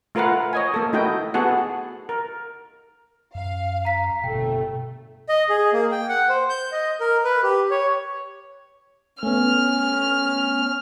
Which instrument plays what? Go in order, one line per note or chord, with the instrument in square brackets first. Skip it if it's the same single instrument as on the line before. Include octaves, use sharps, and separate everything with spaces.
[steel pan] A3 F4 A#4 B4 F5 F#5
C#5 D#5 G#5
A#3 A4
A3 D#4 E4 F#4 D#5 G5
B3 F#4 G#4 A4 F#5
A#4
[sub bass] F#2 [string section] F5
[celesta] A#5 B6
[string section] G1 A3 [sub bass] B2 [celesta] G5
[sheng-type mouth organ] D#5
G#4
A#3
G5
F#5
C5
G6
D#5
A#4
B4
G4
C#5
[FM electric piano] A3 B3 [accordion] C#4 [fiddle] F6